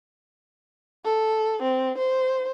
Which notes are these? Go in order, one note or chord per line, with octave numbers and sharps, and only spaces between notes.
A4
C4
C5